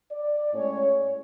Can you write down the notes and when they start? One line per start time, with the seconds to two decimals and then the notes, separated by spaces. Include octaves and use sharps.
0.11 D5
0.54 A2 G#3 C#4 C#5